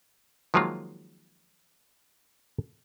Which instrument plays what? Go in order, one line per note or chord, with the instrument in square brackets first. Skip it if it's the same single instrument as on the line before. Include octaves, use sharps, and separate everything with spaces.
[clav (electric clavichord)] D#3 F3 F#3 G#3 A#3 F4